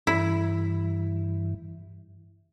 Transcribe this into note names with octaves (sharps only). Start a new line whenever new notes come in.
G2 E3 E4